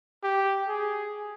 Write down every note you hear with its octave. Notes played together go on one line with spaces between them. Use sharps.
G4
G#4